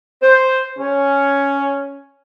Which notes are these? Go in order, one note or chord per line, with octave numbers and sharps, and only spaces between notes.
C5
C#4